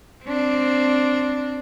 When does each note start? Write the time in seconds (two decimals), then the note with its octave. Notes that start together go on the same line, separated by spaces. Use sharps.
0.24 C4 D4